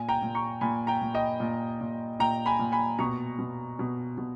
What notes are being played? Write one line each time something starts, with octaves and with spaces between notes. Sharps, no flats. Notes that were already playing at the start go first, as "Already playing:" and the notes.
Already playing: A#2 G#5
G5 A#5
A#2
A#5 C#6
A#2 G#5 B5
G5 A#5
A#2
D#5 G5
A#2
A#2
A#2 G5 A#5
G#5 B5
A#2
G#5 B5
B2 A#5 C#6
B2
B2
B2